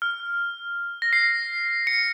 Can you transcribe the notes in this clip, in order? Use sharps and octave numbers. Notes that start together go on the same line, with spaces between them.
F6
A#6
C7
C#7